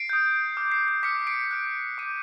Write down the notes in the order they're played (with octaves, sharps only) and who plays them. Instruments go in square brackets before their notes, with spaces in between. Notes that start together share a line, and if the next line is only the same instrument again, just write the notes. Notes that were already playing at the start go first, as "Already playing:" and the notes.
Already playing: [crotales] C7 D7
D#6 G6
D6 F6
C7
C7
D6 F6 B6 C#7
C7 D7
D6 F#6
D6 G6 C#7 D#7